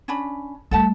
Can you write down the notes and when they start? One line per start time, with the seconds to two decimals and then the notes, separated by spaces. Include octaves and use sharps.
0.08 C#4 D4 B5
0.71 G3 A3 A4 F#5 A5